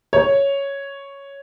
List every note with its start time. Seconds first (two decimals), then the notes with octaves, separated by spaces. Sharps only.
0.13 C#5